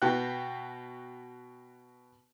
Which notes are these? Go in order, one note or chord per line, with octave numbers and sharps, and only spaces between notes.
B2 F#4 B4 G5 A5 F#6